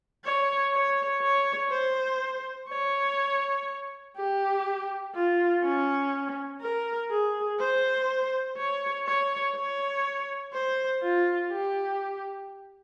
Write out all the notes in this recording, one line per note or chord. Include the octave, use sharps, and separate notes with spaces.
C#5
C#5
C#5
C5
C#5
G4
F4
C#4
A#4
G#4
C5
C#5
C#5
C#5
C5
F4
G4